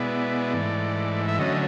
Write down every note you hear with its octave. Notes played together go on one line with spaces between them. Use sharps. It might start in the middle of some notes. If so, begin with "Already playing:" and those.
Already playing: B2 G#3 B3 E4 D5
G#2 E3 A3
E5
D3 F#3 A3 C#4 D#5